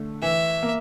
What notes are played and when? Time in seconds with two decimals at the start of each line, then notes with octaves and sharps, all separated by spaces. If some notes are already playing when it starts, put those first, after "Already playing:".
Already playing: D3 A3
0.22 E3 E5
0.63 A#3